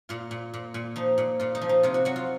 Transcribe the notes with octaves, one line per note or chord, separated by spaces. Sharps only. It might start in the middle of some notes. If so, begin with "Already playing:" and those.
A#2 F4
A#2
A#2
A#2
F3 D#4
A#2
A#2 F4
D#4
F3
D#4
C3 F4
F#4
F#3 F#4
F4